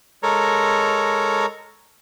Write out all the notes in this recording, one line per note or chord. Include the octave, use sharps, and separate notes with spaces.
G#3 A4 A#4 C#5 A#5